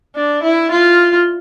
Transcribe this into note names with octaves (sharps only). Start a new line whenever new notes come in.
D4
E4
F4